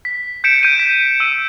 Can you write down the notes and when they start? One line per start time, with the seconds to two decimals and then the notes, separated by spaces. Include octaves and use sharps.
0.05 B6
0.44 G6 B6 C#7 D7 E7
0.63 G6 D7 D#7
0.79 B6
1.20 E6 D#7